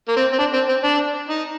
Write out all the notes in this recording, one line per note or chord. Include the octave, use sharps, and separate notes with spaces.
A#3
C4
C4
D4
C4
C4
D4
D#4